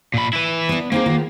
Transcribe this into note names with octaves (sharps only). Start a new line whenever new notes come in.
A#2 B5
E4 B4
B3 D4
A#3 C4 D#4 G#4
D#3 B3 F4